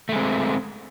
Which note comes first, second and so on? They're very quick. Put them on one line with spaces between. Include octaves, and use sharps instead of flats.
A3 G#3 C4